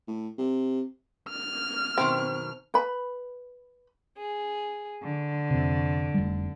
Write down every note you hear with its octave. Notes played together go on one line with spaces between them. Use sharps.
A2
C3
F6
F#2 B2 D#3 C4
B4 B5
G#4
D3
F2 C3
F1 G3